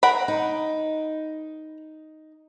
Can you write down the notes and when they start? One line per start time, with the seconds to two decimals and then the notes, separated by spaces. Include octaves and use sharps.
0.03 A#4 F#5 B5
0.28 D#4